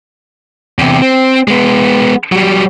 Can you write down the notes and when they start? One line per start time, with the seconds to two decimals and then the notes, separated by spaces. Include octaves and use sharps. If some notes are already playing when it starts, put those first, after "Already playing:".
0.79 E2 C3
1.02 C4
1.48 G#3 B3
2.32 F#3 G3